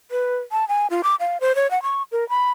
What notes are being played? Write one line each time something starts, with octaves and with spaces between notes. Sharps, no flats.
B4
A5
G#5
F4
D6
F5
C5
C#5
F#5
C#6
A#4
B5